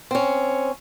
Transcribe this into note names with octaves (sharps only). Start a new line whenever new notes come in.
C4 C#4